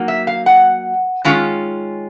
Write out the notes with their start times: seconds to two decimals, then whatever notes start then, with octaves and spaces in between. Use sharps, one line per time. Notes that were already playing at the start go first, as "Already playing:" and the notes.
Already playing: F#3 A#3 D#4
0.08 E5
0.27 F5
0.46 F#5
1.24 D#3 G#3 C#4 F4